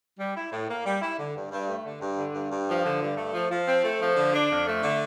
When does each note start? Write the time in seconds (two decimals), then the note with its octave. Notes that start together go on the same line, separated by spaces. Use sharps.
0.19 G3
0.35 E4
0.51 A2
0.69 A#3
0.85 G3
1.02 E4
1.18 D3
1.35 G2
1.51 G2
1.68 A3
1.84 D3
2.01 G2
2.18 D3
2.34 G2
2.50 G2
2.68 F3
2.84 D3
3.00 G2
3.17 A3
3.33 F3
3.50 F3
3.67 C4
3.83 A3
4.01 F3
4.16 D3
4.33 D4
4.50 F2
4.67 A3
4.83 D3